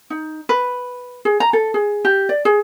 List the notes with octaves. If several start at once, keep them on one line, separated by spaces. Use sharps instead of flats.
D#4
B4
G#4
A#5
A4
G#4
G4
D5
G#4